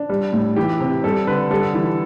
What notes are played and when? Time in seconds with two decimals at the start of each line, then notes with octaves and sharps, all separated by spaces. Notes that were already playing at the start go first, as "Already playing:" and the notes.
Already playing: D4
0.09 G3
0.33 A2
0.56 E3 G4
0.80 C3
1.04 G3 A4
1.27 D3 B4
1.51 G3 A4
1.74 E3